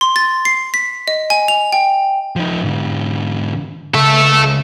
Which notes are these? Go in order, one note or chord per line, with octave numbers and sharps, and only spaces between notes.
C6
A6
C7
B6
D#5
G#5
F7
G5
F3 D#4
G#2 D3
C#2 A4 E5